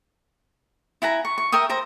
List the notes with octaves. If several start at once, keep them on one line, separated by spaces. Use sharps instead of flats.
E4 F#5 G#5 A#5
C#6
C#6
A#4 E5 G5 D#6
A#4 C5 A#5